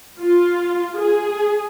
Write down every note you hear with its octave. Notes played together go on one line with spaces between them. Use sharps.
F4
G#4